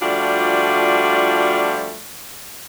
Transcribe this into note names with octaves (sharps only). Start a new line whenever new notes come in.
F3 G3 A3 D4 F4 F#4